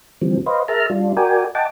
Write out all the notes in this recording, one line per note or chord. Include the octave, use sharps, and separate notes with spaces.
D3 E3 F3 G3 C4
B4 C5 D#5 F5
G#4 A#4 E5 A5 A#5 F6
G3 D4 F4
F#4 A#4 D5 G5 G#5
D#5 F#5 G5 A5 D6